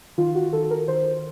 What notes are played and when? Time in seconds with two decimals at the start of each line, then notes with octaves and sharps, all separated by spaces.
0.18 D#3 F4
0.35 F#4
0.53 D#3 A4
0.71 A#4
0.88 D#3 C5